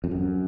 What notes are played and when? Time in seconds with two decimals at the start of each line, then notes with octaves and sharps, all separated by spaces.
0.04 F2
0.11 F#2